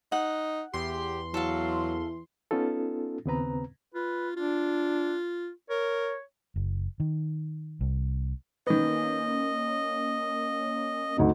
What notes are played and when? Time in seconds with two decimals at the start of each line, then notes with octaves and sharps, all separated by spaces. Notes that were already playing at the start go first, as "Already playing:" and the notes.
0.12 D#4 F#5
0.74 E2 G4 C6
1.34 E3 F#3 A4 F5
2.51 B3 C#4 D#4 F4 A4
3.25 D#2 C#3 B3 C4 B4 A#5
3.94 F4 B4
4.36 D4 F4
5.70 A#4 C#5
6.56 F#1
7.00 D#3
7.81 C2
8.67 D#3 A#3 B3 C#4 D#5
11.17 D2 D#4 D#5